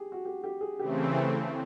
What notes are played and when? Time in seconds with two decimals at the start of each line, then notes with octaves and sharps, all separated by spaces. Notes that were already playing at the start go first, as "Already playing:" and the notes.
Already playing: G4 G#4
0.12 F#4
0.25 G4
0.44 G4
0.61 G#4
0.79 C#3 E3 A3 C4 G4